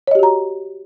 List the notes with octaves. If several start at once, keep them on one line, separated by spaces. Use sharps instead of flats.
F#4 G4 C#5 D#5 A#5